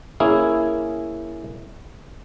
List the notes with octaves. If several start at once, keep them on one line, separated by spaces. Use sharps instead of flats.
A#3 C#4 E4 G#4